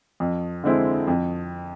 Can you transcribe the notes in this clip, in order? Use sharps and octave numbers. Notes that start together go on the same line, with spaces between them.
F2
D3 G#3 C4 E4
F2